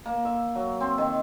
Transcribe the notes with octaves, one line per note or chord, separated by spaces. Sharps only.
A#3
E5
F#3
C4
D#3